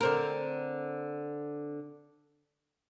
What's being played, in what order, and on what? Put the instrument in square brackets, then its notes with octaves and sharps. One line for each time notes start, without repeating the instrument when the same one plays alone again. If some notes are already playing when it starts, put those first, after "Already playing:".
[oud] D3 C4 A#4